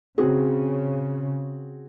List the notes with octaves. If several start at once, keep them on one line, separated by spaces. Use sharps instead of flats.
C#3 C4 F#4 G#4